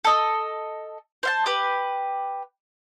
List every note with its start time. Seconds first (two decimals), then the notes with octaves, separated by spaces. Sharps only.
0.05 A4 D#5
1.23 C5 F5 A5
1.46 G4 B4